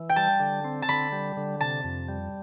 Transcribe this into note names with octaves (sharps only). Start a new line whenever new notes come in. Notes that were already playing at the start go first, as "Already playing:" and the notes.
Already playing: E3
G5
G3 A5
D3
C4
A5
D3 B5
G3
D3
C3 A5
F2
G3